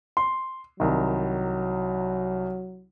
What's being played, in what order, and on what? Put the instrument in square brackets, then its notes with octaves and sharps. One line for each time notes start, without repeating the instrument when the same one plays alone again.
[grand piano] C6
[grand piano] C2 D#3 [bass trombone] F#3